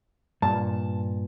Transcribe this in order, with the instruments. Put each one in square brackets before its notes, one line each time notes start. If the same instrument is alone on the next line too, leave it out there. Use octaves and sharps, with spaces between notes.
[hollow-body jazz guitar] G2 A#2 [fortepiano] A5